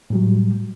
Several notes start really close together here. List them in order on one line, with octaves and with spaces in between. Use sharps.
A2 G3 F#3